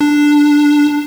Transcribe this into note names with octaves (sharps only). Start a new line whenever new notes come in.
D4